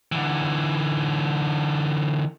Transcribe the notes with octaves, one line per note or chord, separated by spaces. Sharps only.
D3 E3